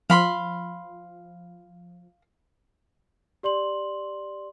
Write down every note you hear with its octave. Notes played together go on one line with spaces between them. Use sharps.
F3 F5 B5 C6
G4 D5 C6 F#7